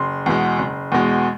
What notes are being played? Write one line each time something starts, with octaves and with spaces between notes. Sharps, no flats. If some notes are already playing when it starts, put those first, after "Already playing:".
Already playing: F#1 C6
E2 B2 G#3
F#1
E2 B2 G#3